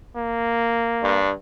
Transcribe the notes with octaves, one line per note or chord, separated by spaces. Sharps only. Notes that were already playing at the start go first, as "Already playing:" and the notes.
A#3
G2